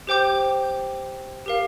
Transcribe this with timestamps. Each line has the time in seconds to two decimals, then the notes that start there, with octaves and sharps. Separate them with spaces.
0.07 G4 C5 G5 D6 G6
1.46 G4 A#4 F5